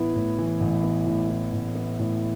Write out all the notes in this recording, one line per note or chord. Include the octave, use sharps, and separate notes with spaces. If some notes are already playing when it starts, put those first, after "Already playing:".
Already playing: A1 A2 E3 B3 E4
A2
E3
A1
B3
A2
E3
A1
B3
A2